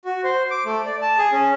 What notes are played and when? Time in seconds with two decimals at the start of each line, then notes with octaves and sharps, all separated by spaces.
0.05 F#4
0.24 C5
0.51 D6
0.65 A3
0.85 D5
1.02 A5
1.18 G#4
1.32 C#4